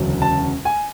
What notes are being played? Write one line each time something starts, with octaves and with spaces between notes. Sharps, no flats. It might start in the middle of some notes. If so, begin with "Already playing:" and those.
Already playing: E1 D2 C#3 F#3 C#4
A5
G#5